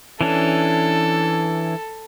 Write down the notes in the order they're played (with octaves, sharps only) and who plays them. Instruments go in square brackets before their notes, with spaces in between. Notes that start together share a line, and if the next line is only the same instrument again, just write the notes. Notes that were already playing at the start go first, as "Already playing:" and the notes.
[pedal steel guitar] E3 C#4 D4 [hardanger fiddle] A4